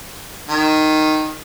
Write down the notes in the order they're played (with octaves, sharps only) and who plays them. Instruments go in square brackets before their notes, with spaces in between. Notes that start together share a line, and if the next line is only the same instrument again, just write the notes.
[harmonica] D#3